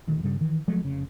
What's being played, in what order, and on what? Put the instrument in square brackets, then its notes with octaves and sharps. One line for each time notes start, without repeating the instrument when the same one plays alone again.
[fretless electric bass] D#1 D2 D#3
G2 C#3 G3
D#3 E3
F3 F#3 G#3 A3
F1 C#3